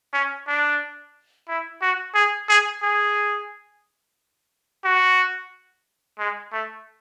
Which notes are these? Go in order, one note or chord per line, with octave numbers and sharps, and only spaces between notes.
C#4
D4
E4
F#4
G#4
G#4
G#4
F#4
G#3
A3